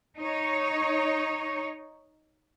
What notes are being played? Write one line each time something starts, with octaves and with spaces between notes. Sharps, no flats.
D#4 C#5